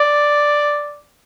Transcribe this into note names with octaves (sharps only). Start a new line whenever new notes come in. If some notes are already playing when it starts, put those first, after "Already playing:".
Already playing: D5